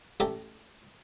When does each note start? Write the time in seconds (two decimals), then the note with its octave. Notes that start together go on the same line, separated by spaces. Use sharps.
0.20 A1 A3 G4 A4 D5 A#5